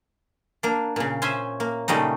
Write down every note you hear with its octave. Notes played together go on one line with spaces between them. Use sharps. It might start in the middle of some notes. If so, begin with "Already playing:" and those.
A#3 D4
A#2 C#3
C#4 C5 E5 G#5
A#3
A#2 C#3 G3 A3 D#4